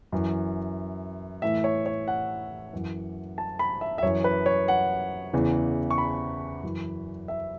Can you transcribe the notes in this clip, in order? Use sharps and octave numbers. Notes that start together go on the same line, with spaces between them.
F#2 E3
A2 E3 E5
C#5
C#5
F#5
F#2 E3
A5
B5
E5
E5
F#2 E3 C#5
B4
C#5
F#5
E2 C#3 E3
C#6
B5
F#2 E3
E5